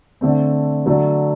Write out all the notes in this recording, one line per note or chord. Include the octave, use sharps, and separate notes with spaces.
D3 A3 C4
D3 F#3 A3